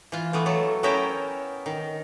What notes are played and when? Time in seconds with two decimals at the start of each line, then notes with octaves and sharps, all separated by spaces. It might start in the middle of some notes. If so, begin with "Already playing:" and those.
0.12 E3 F4
0.33 E3 A3 B3
0.46 F#3 A3 A4
0.83 B3 C#4 E4 A#4 E5 G5
1.66 D#3